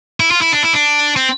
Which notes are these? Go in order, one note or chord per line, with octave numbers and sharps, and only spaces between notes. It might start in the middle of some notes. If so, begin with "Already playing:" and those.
E4
F4
E4
D4
E4
D4
C4